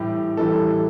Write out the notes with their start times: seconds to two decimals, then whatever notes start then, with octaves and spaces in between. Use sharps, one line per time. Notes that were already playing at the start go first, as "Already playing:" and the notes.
Already playing: A2 E3 G3 G4
0.37 A2 E3 G3 A4